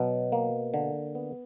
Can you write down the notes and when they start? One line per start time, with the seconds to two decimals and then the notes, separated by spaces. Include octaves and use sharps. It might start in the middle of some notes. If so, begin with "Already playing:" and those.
Already playing: B2 F#3
0.32 A#3
0.74 D3
1.15 B3